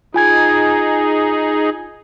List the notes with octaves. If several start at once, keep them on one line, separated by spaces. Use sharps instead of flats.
D#4 F4 G#4 G#5 G#6